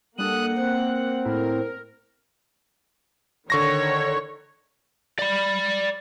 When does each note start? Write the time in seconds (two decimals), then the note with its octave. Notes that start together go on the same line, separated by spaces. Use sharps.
0.18 G3 A#3 D4 A4 F#5 D#6 F#6
0.58 C4 F#6
1.25 A2 E4 A#4
3.50 D3 D#3 C#5 C#6 A#6
5.19 D5 B5